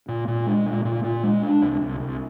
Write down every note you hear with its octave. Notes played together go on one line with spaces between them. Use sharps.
A#2
A#2
G#3
A#2
A#2
A#2
G#3
D4
C2
C2
C2